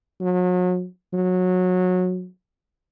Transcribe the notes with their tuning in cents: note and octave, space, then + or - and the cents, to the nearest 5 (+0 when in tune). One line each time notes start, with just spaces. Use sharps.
F#3 -35
F#3 -20